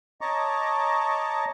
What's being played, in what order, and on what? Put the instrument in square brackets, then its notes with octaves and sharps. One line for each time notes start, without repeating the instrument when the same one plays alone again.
[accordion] C#5 D#5 A5 A#5 C#6 D6